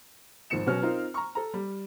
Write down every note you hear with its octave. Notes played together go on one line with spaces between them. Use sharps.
G#1 D#3 F3 C#7 E7
B2 F#3 C#4 F6
C4 D#4 F4 A#4
A#5 C#6
A4 A#5
G3